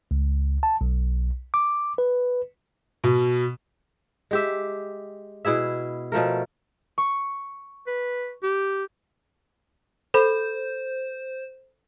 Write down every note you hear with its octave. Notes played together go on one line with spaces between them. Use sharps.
C#2
A5
B1
D6
B4
B2
G#3 G4 E5
B2 E4 G#4 E5
B2 F3 A3 A#4
C#6
B4
G4
A4 C5 B5